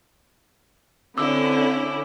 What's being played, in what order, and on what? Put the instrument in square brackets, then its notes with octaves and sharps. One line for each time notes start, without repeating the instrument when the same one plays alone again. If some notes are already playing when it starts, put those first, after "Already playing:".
[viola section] D3 [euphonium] C4 [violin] C#4 E4 [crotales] D6 E6